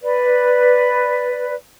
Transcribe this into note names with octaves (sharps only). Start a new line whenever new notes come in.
B4 D5